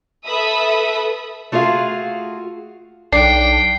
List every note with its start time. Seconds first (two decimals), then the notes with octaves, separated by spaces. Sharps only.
0.24 A4 B4 E5 B5 D#6
1.52 A3 F4 F#4 G#4 F5
3.13 B1 D4 G5 C7